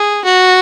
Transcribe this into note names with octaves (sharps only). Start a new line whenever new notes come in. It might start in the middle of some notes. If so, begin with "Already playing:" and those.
Already playing: G#4
F#4